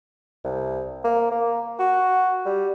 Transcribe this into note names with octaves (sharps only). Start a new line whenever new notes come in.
C2
A#3
A#3
F#4
G3